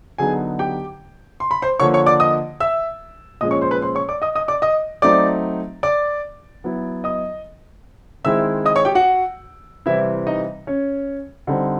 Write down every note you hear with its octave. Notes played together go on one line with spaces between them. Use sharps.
D3 F#3 B3 D#4 G#4 G#5
G4 G5
C6
B5
C5 C6
D3 F3 A#3 C#5 C#6
C#5 C#6
D5 D6
D#5 D#6
E5 E6
A#2 F3 G#3 C#4 D#5 D#6
C#5 C#6
C5 C6
B4 B5
C5 C6
C#5 C#6
D5 D6
D#5 D#6
D#5 D#6
D5 D6
D#5 D#6
F#3 A3 C4 D#4 D5 D6
D5 D6
F#3 B3 E4
D#5 D#6
D#3 G#3 C4 E4 E5 E6
D#5 D#6
C#5 C#6
G4 G5
F#4 F#5
C3 E3 G3 C4 E4 E5
D#4 D#5
C#4 C#5
D3 G3 C4 D#4